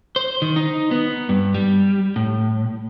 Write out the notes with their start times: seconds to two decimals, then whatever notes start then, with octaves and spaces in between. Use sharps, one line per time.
0.16 C5
0.42 D#3
0.56 D#4
0.91 B3
1.29 G2
1.54 G3
2.16 A2